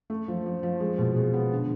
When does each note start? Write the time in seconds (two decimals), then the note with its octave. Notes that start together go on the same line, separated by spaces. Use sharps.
0.10 A3
0.28 F3
0.46 F3
0.63 F3
0.80 G#3
0.98 B2
1.16 G#3
1.34 B3
1.52 D3